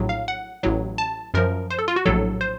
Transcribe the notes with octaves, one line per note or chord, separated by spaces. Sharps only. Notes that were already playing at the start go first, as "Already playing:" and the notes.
Already playing: A#1 A2 F#3
F5
F#5
A1 A2 F#3
A5
F#2 F3 A#4
C5
A4
F4
F#4
A#1 A2 F#3 A4
C5